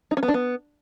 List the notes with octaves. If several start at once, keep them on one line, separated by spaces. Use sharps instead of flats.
D#4
C#4
B3
D4
B3